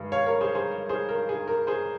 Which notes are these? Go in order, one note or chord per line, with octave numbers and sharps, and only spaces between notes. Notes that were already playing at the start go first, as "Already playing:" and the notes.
Already playing: G2 D#3 G#3
C#5 F5
A#4 C#5
G#4 C5
G#4 C5
G#4 C5
A#4
G#4
A#4
G#4 C5